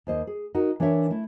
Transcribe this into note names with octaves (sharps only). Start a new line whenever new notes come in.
D#2 C5 D#5
G#4
D#4 F#4 A#4
E3 D4 A#4 C#5 E5
A3 E4